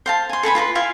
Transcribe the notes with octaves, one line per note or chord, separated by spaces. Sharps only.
C5 F5 A5
G#5 C6
A4 B4 G#5 B5
F4 B4 A#5 C6
E4 F4 F5 G#5